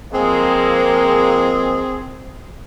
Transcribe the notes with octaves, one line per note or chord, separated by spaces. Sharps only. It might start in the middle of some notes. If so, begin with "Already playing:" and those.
F3 G#3 A#3 C4 G#4